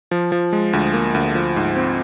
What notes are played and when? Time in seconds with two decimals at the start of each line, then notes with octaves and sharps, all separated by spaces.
0.11 F3
0.32 F3
0.53 G#3
0.73 D2
0.93 A#3
1.15 D2
1.35 F3
1.56 G#2
1.76 C4